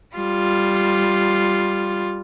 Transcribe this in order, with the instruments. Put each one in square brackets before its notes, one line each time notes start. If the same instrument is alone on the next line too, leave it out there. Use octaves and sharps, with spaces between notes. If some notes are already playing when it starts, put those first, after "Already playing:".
[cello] G3 F4